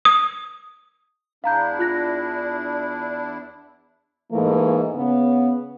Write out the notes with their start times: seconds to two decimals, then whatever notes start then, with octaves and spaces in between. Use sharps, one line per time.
0.05 D#6
1.44 E2 D4 E4 F5 A#5 G6
1.79 F4 F#6 A#6
4.32 G#2 E3 A3 A#3
4.95 C#3 B3